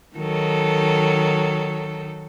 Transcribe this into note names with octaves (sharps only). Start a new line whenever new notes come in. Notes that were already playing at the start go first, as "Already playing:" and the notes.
D#3 F#3 A4